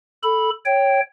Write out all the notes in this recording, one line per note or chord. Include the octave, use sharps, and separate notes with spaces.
A4 B5
C#5 G5